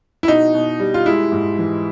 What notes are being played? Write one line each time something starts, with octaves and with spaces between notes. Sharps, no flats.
E4
B2 D#4
B2
G3
F4
G#3 E4
G#2
E3